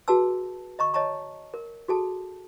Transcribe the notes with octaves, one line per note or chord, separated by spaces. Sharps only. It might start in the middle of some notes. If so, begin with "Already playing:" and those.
F#4 G#4 B4 A5 E6
D#5 A#5 C#6
C#5 D#5 A5 A#5 C#6
A#4
F#4 G#4 A4 A5